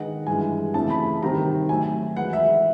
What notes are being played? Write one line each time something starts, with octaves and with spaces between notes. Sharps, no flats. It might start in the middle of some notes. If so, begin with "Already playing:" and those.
Already playing: D#3 G#3 B3 D#4 G#4 F#5
G2 E3 G#3 G#5
F2 C#3 E3 A3 A5
B5
C3 D#3 G3 C4 A#5
F#3 A3 C4 G#5
E3 G#3 B3 E4 F#5
E5